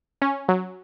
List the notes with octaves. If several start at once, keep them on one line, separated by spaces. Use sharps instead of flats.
C#4
F#3